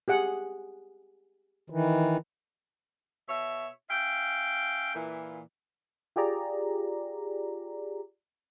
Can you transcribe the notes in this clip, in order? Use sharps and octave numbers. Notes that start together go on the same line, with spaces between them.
G4 G#4 F#5
D#3 E3
B2 C#5 E5
C#4 E5 F5 G5
A#2 E3
F4 G4 G#4 D5 A#5